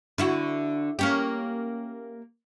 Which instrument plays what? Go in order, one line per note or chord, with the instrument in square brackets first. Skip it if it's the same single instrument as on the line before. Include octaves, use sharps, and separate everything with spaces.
[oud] D3 E4 F#4
A#3 C#4 G4